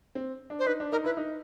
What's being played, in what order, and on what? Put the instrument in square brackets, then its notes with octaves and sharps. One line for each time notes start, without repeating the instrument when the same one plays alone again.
[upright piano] C4
D4
[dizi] C5
[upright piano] D#4 [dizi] B4
[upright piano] D4
[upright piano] D#4 [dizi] A#4
[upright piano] E4 [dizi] B4
[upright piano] D#4